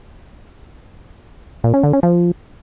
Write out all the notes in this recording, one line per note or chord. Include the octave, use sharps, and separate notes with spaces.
A#2
C#4
D3
C#4
F3